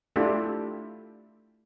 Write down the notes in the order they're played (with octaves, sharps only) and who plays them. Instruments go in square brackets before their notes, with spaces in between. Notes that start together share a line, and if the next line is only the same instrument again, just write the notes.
[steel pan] A3 D4 E4 F4 G4 A4